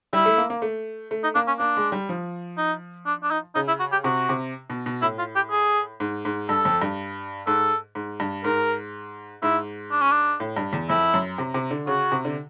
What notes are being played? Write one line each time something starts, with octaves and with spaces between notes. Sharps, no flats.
G3 E4
A3
A#3
A#3
A3
A3
D#4
A#3 D4
C#4
A#3 D4
G#3
G3
F3
D#4
D4
D4
D#4
C#3 D#4
E4
F#4
G4
C3 F#4
C3
B2
B2
A2 E4
F4
G4
G#4
G#2
G#2
G2 A4
F2
G2
G#2 A4
G#2
G2
G#2 A#4
G#2 E4
D4
C#4
D4
A2
G2
E2
F2 E4
F#2
C3
C3
D3
C#3 F#4
C3
D3